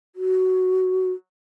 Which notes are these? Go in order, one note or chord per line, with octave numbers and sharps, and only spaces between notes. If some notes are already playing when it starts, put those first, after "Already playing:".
F#4